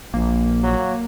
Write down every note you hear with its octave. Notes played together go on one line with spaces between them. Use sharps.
A#1 A#3
F#3